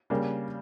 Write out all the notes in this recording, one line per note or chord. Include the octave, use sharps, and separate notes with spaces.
C#3 G3 A#3 D4